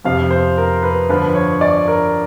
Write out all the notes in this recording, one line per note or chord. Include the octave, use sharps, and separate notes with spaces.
F2 C3 F3 F5
C5
A#4
B4
G2 D3 F3 B4
C#5
D5
A#4